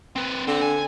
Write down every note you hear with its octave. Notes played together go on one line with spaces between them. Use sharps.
C4 B4
D3 C4
G#5